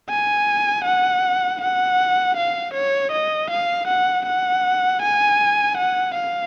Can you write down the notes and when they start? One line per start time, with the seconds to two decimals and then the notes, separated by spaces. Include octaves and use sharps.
0.10 G#5
0.85 F#5
1.61 F#5
2.37 F5
2.74 C#5
3.12 D#5
3.51 F5
3.88 F#5
4.26 F#5
5.02 G#5
5.78 F#5
6.15 F5